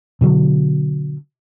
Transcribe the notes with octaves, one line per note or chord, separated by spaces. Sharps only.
B2 D3 F#3